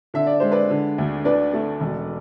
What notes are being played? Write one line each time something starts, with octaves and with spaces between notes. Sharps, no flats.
D3 E5
D5
G#3 C5
B4 D5
D3
D2
D4 B4 D5
A3
E1